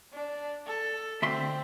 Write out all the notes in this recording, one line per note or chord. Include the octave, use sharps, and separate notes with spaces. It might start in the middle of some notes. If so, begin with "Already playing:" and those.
D4
A4
D2 C4 E5 C6